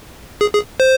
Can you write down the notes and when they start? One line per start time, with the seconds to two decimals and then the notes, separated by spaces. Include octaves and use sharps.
0.41 G#4
0.54 G#4
0.80 C5